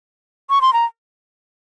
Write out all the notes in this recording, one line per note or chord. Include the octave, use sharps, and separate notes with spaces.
C#6
C6
A#5